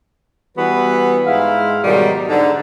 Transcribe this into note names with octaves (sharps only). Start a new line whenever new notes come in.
E3 G3 B3 F#4 B4
G#2 G#3 E4 F5
G#2 B2 D#3 F#3 G3
G#2 D3